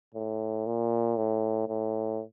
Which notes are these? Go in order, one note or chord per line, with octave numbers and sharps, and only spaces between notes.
A2
A#2
A2
A2